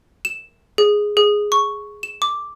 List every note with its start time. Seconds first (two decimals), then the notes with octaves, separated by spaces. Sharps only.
0.25 E7
0.78 G#4
1.17 G#4
1.52 C#6
2.03 E7
2.22 D6